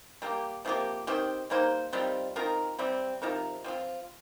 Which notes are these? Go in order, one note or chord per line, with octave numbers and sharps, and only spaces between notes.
G3 A#3 G4
C3 F3 A#3 G4
D#3 C4 G4 C5
G3 A#3 D#4 C5
D#3 G3 C4 F4
D#3 C4 F4 A#4
C3 G3 C4
C3 F3 D#4 A#4
F3 C4 F4